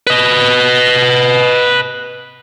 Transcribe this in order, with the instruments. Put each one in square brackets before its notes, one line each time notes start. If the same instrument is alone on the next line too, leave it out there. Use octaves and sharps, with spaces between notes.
[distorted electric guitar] B4 D#5